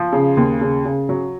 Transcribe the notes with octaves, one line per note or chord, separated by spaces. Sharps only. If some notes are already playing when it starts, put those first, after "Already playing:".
Already playing: F3
C#3
D#2
C#3
C#3
F#3